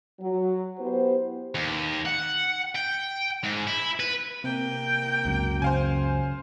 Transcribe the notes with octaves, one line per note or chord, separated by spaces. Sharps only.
F#3
B3 E4 G4 C5
D#2
F#5
G5
G#2
E4
B4
C3 A#3 G5
C#2 F#2
C#3 C5 F5 G#5